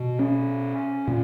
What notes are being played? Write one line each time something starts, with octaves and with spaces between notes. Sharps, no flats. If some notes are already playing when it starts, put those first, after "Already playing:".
Already playing: B2
C#4
A#2